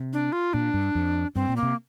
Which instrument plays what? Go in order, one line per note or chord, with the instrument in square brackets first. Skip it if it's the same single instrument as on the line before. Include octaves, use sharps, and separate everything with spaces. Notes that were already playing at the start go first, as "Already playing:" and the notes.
Already playing: [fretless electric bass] C3
[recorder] D4
F4
[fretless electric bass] A#2 [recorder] D4
[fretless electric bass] G2
F2
[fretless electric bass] G2 [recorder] C4
[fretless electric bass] A#2
[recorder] A#3
[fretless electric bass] C3